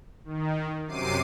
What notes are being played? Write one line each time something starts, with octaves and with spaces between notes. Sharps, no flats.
D#3
F#2 C3 D6 C7 D#7